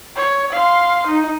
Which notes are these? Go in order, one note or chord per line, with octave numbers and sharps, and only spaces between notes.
C#5
F5 C6
D#4